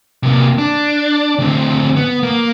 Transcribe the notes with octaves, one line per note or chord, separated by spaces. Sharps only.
C3 A#3
D4
D2 C4
B3
A#3